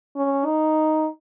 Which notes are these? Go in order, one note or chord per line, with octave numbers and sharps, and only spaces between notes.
C#4
D#4